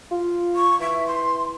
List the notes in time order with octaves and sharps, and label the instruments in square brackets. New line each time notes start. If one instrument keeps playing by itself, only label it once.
[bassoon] F4
[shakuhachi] C#6
[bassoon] E3 [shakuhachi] E5
[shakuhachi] C6